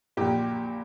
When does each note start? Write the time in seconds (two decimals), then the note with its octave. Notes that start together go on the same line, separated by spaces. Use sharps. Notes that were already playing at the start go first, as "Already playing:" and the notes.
0.17 A#1 A#2 G4